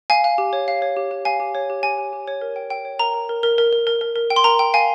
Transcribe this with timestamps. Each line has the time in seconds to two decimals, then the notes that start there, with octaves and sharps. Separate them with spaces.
0.10 F5 G#5
0.24 F5
0.38 G4
0.53 C#5
0.68 F5
0.82 C#5
0.97 G4
1.11 G4
1.25 F5 G#5
1.40 G4
1.55 C#5
1.70 G4
1.83 G4 G#5
1.98 G4
2.13 G4
2.27 C#5
2.41 A#4
2.56 G5
2.70 G5
2.85 C#5
2.99 A#4 A#5
3.14 A#4
3.29 A#4
3.43 A#4
3.58 A#4
3.73 A#4
3.87 A#4
4.01 A#4
4.16 A#4
4.30 G5
4.36 C6
4.44 A#4 A#5
4.59 G5
4.74 F5 G#5